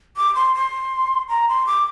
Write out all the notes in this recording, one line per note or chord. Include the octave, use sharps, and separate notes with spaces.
D6
C6
C6
A#5
C6
D6